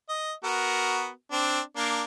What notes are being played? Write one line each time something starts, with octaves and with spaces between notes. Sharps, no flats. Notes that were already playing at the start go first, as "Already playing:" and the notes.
D#5
B3 F#4 A#4
C4 D4
A#3 D4